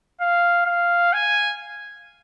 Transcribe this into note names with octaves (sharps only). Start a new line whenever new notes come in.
F5
F5
G#5